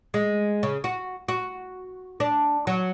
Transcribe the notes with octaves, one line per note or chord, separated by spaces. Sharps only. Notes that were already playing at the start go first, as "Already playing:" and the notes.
G#3
C#3
F#4
F#4
D4
F#3